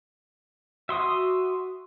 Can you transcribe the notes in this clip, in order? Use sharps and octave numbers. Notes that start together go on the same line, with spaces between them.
F#4 E5 C6 D#6